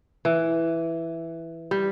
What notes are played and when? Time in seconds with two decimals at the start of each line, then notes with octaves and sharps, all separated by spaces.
0.25 E3
1.71 G3